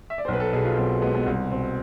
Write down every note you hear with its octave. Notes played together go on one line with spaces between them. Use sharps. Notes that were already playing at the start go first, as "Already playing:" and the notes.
E5
D5
C5
B1 B4
A4
B2 G#4
F4
B1 C4
G#3 B3
B3
C2 C4
B2 C4